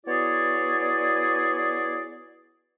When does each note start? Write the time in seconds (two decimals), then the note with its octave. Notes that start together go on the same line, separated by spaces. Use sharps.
0.06 B3 E4 F#4 G#4 C#5 D5